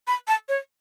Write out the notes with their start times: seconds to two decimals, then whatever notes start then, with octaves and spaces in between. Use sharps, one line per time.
0.07 B5
0.28 A5
0.49 C#5